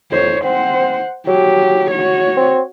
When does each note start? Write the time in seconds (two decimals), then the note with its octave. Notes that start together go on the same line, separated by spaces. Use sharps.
0.12 F2 C5 C#5
0.44 C4 C5 F#5
1.27 F#3 G4
1.91 F#4 C#5
2.37 C4